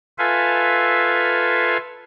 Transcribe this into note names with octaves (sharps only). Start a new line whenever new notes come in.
F4 A4 B4 E5 F5 G#5